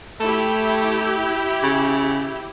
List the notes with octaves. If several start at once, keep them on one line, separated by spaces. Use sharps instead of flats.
A3 E4 G4
C#3